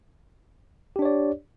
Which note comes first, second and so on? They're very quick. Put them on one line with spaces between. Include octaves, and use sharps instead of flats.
G4 D4 C#5 D5